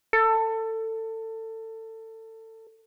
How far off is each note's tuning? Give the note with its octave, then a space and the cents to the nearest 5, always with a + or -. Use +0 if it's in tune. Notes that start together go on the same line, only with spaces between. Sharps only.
A4 +25